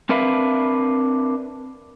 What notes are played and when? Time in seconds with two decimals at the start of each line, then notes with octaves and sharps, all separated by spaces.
0.09 C4 D4 A#4 B4 E5 F5